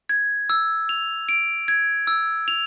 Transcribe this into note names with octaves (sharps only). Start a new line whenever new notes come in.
G#6
E6
F7
D7
G#6
E6
F7